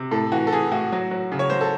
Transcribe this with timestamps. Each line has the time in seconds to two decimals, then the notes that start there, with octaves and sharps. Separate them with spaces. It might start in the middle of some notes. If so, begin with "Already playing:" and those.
Already playing: C3
0.11 A2 A4
0.32 E3 F#4
0.47 A4
0.52 E3 G#4
0.72 A2 F#4
0.92 F#3
1.11 F#3
1.32 C#3
1.39 C#5
1.50 F#3 C5
1.61 A4